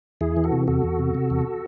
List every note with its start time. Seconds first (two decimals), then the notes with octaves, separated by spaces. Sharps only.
0.21 E2 E4 G#4
0.37 E3
0.44 F#4 A4
0.52 C3
0.68 E2 F#4 A4
0.83 E2
0.99 C3
1.15 C3
1.30 E2